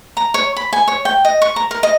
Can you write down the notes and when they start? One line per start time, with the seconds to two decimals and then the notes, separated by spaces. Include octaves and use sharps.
0.17 A#5
0.34 C#5
0.56 B5
0.73 G#5
0.88 C#5
1.05 G5
1.25 D#5
1.42 C#6
1.56 A#5
1.71 A#4
1.83 D#5